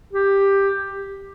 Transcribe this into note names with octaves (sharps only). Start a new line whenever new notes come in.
G4